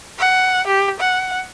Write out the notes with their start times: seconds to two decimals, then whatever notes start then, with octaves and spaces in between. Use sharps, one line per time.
0.19 F#5
0.67 G4
1.01 F#5